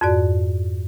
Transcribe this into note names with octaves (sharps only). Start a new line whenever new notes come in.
F2 G#2 F#4 D5